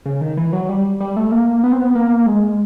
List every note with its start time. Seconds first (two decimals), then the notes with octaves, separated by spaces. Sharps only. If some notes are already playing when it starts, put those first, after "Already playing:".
0.06 C#3
0.21 D#3
0.37 E3
0.53 F#3
0.69 G3
1.00 G3
1.16 A3
1.32 A#3
1.64 B3
1.72 C4
1.80 B3
1.95 A#3
2.26 G#3